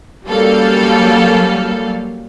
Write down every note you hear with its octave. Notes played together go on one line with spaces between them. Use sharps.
F#3 G3 A#3 C#4 A4 F5